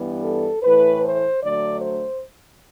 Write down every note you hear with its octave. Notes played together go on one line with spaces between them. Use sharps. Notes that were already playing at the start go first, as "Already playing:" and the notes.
Already playing: G2 E3 G3 B3
A4
A2 E3 A3 B4
C5
D2 D3 F#3 A3 D5
C5